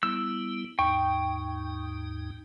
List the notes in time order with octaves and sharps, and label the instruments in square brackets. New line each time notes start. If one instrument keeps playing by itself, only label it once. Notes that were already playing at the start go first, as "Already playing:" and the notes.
[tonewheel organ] G3 B3 E4 [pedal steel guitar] E6
[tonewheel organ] D#2 G#2 D#4 [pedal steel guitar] G5 [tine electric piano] C#6